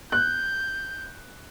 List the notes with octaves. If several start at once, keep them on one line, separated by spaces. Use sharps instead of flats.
F#6 G6